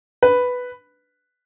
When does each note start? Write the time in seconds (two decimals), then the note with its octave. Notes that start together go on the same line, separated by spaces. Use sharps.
0.23 B4